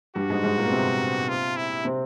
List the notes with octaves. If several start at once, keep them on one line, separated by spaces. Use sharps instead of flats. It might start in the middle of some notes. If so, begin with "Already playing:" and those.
G2 G3 F#4
G#2 G#3
G#2 G#3
A#2 A#3
B3
C3 C4
F4
E4
C3 C4